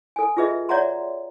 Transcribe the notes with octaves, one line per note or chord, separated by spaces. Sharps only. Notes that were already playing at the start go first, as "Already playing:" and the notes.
A4 G#5
F4 F#4 G#4 B4 D#5 E5
C#5 D5 E5 F#5 A#5 C6